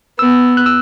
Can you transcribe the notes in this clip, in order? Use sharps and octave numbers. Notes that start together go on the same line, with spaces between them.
B3 E6
F#6
E6